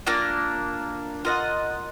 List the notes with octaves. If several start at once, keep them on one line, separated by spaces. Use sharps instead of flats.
A#3 D4 F4 A#4
F4 A#4 D#5 F#5